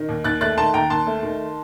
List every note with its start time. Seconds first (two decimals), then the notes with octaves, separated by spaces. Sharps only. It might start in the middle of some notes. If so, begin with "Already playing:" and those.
Already playing: D#3
0.09 D#2
0.24 D#2 F#6 A6
0.41 A3 F#6 A6
0.57 D#3 A5 C6
0.74 D#2 G5 A#5
0.90 D#2 A5 C6
1.07 A3
1.23 D#3